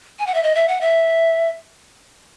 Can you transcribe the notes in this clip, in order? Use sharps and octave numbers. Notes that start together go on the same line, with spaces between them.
G#5
F#5
E5
D#5
E5
F#5
E5